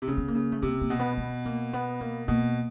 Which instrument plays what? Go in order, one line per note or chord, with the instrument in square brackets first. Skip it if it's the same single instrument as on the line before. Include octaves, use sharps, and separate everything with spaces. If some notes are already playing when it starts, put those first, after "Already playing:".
[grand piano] C3
[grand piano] C#3 [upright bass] A#3
[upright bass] B3
A#3
[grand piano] C#3
[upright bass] A3
[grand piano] C3 [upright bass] A#3
[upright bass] A#3
[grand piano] B2
[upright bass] B3
B3
A#3
B3
A#3
[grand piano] B2 [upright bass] A#3